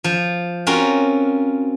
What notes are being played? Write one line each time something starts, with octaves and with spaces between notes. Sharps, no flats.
F3
C4 C#4 F4 F#4 A#4